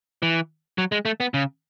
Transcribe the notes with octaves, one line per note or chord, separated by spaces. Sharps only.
E3
F#3
G#3
A3
B3
C#3